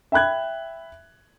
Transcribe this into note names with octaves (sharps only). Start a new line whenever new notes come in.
E5 G5 B5 F#6 G#6